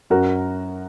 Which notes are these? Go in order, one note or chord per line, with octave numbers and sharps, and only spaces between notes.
F#2 F#4 A#4